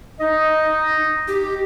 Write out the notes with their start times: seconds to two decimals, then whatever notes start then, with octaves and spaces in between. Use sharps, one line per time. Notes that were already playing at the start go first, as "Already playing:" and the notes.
0.20 D#4 D#5
1.28 G4